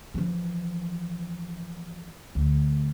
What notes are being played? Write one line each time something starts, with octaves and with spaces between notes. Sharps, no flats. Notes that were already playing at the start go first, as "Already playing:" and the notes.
E3 F3
D2